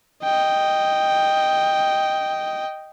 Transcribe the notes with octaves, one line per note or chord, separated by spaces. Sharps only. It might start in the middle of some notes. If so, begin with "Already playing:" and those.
D#5 G5